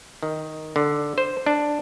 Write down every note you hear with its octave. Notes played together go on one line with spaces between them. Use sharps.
D#3
D3
C5
D4